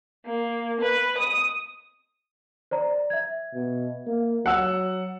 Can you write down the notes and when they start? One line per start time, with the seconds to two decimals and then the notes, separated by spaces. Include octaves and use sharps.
0.25 A#3
0.80 B4
1.18 D#6
2.71 C5 D5 A#5
3.10 E5 G#6
3.54 B2
4.07 A#3
4.46 F#3 F#5 E6